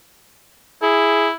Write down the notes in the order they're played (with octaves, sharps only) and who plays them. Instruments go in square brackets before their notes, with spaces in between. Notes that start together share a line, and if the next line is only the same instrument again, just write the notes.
[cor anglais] E4 [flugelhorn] G#4